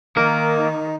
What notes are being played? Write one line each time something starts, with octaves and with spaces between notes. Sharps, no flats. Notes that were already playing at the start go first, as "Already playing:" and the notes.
D#3 A#3 D#4 A#4